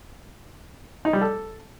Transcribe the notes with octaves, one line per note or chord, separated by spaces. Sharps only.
D#4
G3
A4